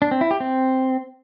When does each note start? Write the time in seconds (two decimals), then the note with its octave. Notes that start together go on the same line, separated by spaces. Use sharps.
0.02 D4
0.11 C4
0.21 E4
0.31 G4
0.40 C4